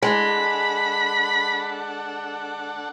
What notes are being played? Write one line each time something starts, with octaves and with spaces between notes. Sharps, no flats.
G#3 D4 A4 F#5 B5